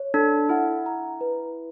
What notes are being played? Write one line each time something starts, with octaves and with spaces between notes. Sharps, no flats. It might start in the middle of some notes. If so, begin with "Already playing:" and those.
Already playing: C#5
D4 A4
E4 F#5
A#5
B4